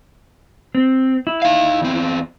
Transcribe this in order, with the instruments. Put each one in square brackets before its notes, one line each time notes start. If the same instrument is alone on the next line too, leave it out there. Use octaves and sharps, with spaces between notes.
[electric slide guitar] C4
E4
[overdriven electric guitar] D#4 F5
E2 C4